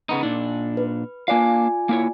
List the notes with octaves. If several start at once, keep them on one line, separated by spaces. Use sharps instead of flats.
C#3 B3 D#4
A#2 D4 D#4
B4
A#3 D4 F4 D5 F5 G#5
A#3 E4 C#5